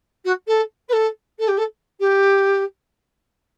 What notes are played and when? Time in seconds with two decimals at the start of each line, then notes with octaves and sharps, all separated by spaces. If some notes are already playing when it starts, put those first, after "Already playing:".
0.24 F#4
0.47 A4
0.88 B4
0.92 A4
1.39 A4
1.48 G4
1.57 A4
2.00 G4